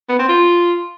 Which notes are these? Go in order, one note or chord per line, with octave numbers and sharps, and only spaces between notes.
B3
C4
F4